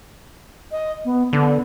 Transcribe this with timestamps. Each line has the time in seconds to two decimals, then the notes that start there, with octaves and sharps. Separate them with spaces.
0.72 D#5
1.05 B3
1.33 D3 B3